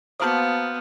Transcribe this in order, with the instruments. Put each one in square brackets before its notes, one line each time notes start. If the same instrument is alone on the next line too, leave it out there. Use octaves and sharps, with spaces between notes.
[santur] A#3 F#4 [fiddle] B3 [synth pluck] C5 A5 [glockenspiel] D#6 F6 G6